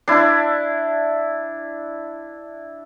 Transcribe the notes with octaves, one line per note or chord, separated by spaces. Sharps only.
D4 E4